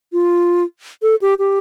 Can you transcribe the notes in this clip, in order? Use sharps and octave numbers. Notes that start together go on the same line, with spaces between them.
F4
A4
G4
G4